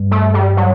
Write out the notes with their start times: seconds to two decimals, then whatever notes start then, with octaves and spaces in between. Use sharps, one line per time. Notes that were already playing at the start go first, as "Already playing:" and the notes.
Already playing: G2
0.11 A3
0.34 G3
0.57 F#3